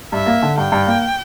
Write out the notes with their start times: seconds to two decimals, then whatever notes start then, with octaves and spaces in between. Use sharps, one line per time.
0.12 G2 E5
0.26 A#3
0.43 D3
0.57 G2 G5
0.72 G2
0.87 A#3